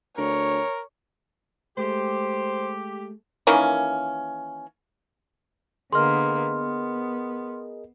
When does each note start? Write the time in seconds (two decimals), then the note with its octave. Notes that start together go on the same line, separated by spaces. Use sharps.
0.18 D2 A#4 C#5
1.77 G#3 A3 G4 C5
3.47 D#3 E3 A#3 C#4
5.93 D3 A#3 B3 G#4 A#4 D#5 C6 F6
6.51 B3